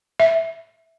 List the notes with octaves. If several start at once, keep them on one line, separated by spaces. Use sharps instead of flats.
E5